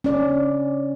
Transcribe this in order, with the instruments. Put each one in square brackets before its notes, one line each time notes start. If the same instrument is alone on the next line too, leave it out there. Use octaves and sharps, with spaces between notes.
[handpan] C#4 D5